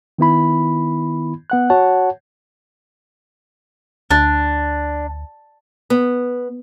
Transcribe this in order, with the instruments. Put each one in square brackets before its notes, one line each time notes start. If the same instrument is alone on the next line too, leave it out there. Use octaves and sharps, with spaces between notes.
[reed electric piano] D#3 B3 E4 B5
B3 F#5 F#6
F#4 C#5 F#5 A5
[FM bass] D2 [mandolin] D4
[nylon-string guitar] B3